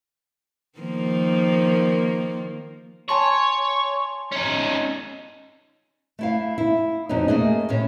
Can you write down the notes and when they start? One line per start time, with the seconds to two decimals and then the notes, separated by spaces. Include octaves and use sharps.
0.78 D#3 F3 A#3
3.09 C#5 G#5 A5 C6
4.32 C#4 D#4
6.19 A3 E4 F5
6.58 E4
7.09 F2 B2 C#4 D#4
7.28 A3 A#3 G#4 D#5
7.69 A2 C3 C#4